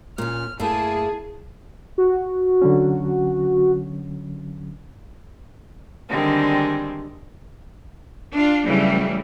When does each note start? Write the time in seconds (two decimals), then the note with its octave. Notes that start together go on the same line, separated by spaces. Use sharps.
0.18 A#2 C#4 F6
0.60 F#2 A3 A#3 E4 G#4 A5
1.98 F#4
2.62 D3 F#3 C#4
6.09 D3 D#3 G3 G#3 C4
8.31 D4 F4
8.64 C#3 E3 F#3 G3 A3